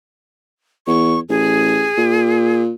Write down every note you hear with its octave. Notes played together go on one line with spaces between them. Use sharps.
E2 C#6
A1 G#4
A#2